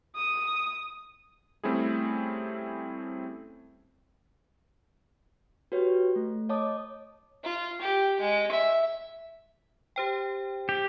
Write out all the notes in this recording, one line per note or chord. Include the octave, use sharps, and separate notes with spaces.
D#6
G3 A3 C4 C#4 E4 G#4
F#4 G4 B4 C#5
A3
C#5 D#5 A5 D6 D#6
F4
G4
G#3
E5
G4 C5 G5
G4